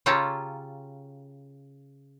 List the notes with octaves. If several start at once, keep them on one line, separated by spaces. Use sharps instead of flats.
C#3 C#4 F4 G4 A4 A#5